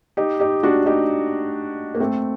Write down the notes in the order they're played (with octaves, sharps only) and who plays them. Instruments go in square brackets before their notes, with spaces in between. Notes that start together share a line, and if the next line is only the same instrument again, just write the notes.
[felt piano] D#4 G4
D#4 G4
D4 F#4
D#4 G4
A#3
A3 C4